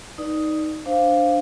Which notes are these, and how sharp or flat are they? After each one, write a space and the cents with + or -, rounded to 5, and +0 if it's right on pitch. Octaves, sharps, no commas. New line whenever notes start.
D#4 +5 B4 -25 D5 +20
D4 +0 C5 +0 F5 +0